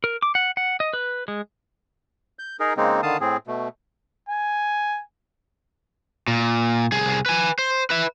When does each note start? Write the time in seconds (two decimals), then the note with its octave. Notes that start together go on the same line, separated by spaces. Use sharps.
0.04 A#4
0.22 D6
0.35 F#5
0.57 F#5
0.80 D#5
0.93 B4
1.28 G#3
2.39 G6
2.60 D#4 G#4 A#4
2.77 C#3 G#3 A#3 C4 D#4
3.03 D3 D#3 F5 A5 D#6
3.21 A2 C4 G#4
3.47 B2 A3
4.29 G#5
6.28 A#2
6.92 C2 G#4
7.26 B4 G#5
7.59 C5
7.90 B4 E5